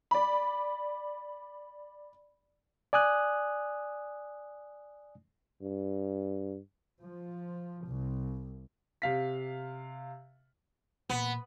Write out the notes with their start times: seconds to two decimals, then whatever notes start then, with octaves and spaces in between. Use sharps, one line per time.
0.11 D5 B5
2.93 D5 G#5 D#6 F#6
5.62 G2
7.01 F3
7.87 C2
9.02 C3 F5 B6
11.09 A#2 E3 B3